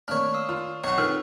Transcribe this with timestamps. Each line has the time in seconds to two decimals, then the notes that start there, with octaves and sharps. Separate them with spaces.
0.08 D#3 A3 A#3 C4 D4 C#5 F6
0.34 F5 D#6 E6
0.49 D#3 F4
0.84 B1 C#5 F#5 C#6
0.98 D#3 C4 F4 A4 B4 E6 F6